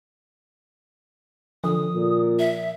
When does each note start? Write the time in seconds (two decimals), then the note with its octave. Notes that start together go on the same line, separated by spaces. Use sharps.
1.64 D3 F3 D#6
1.95 A#2
2.39 E5